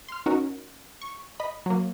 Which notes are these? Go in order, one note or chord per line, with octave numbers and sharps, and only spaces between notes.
C6 F6
C#4 D#4 F#4 A#4
C#6
D#5 B5
F#3 A#3